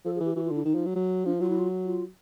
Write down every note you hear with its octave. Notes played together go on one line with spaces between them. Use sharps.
F3 A4
G#4
E3 G4
E3 F#4
F4
D3 E4
D#3 D#4
F3
F#3
F#3
F3 D4
F#3 F4
E4
F4
F4